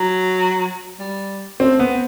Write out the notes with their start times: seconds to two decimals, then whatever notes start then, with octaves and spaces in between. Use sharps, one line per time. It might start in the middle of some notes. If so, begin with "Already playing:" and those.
Already playing: F#3
0.99 G3
1.60 A3 C4
1.79 B3
1.89 C4